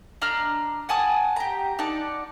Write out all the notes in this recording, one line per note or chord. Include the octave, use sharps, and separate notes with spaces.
D4 D#5 A#5 F6
F#5 G#5 A5 D#6
G4 A#5
D#4 D5 F#5 A5